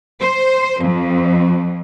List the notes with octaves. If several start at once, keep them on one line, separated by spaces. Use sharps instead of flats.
C5
F2